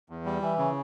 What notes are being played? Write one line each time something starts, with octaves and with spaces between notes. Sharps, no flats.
E2
G3
E3
C#3